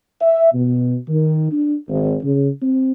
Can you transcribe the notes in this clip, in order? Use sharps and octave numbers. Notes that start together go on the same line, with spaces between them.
E5
B2
D#3
D4
G#1
C#3
C4